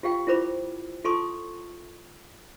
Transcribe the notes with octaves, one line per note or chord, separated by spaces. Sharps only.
F4 G4 F5 G5
E4 F4 A#4 C5 B5 D6
F4 A4 A5 C6 C#6 D#6